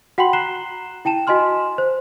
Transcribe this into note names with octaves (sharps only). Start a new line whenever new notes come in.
F#4 F#5 G5 B5 C6 F#7
A#5 F#6 C7 E7 G7
E4 G5 A5 E7
F#4 D#5 G#5 C6 F6
C5